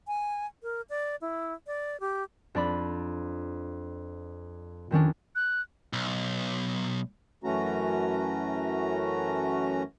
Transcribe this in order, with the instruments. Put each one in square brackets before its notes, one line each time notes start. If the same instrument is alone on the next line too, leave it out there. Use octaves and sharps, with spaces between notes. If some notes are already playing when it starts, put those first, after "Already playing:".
[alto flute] G#5
A#4
D5
E4
D5
G4
[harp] F2 D4 D5 B5
F2 D#3 C#4 D4
[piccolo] F#6
[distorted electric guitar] B1
[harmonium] F#2 E3 A3 C#4 F#4 A#5